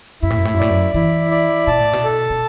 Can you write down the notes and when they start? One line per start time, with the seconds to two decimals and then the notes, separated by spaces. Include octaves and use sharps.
0.22 F#2 E4
0.30 A2
0.37 F#2
0.45 A2
0.54 F#2
0.59 A2 D5
0.69 F#2
0.94 E3 E4
1.31 D5
1.67 B2 A5
1.79 A2
1.93 B2
2.04 A4
2.30 B2